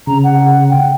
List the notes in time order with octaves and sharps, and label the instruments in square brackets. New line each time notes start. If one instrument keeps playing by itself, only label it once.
[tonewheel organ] C#3 [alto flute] A#5
[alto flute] F#5
G5